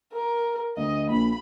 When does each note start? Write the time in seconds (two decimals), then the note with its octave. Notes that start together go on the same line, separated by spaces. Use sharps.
0.13 A#4
0.77 D2 D#5
1.10 A#1 B5